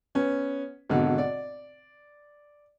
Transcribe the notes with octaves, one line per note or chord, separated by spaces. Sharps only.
B3 C#4
G#1 B2 D3
D5